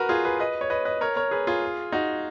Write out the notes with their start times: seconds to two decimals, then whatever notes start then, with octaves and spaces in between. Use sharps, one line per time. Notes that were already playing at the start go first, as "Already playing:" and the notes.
Already playing: F#4 A#4 B4
0.09 F4 G#4
0.25 G#4 B4
0.40 B4 D#5
0.61 C#5
0.70 B4 D#5
0.85 B4 D#5
1.01 A#4 C#5
1.16 A#4 C#5
1.31 G#4 B4
1.47 F4 G#4
1.92 D#4 F#4